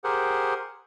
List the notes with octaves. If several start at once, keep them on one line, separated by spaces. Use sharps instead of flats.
G4 G#4 A#4 C5 F#5